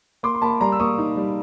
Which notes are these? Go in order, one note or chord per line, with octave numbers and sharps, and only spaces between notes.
A#3 C6 D6
C6
A#3 A5 B5
G3 A#5 C6
E6
A#3 C#6 D#6
D#4
G3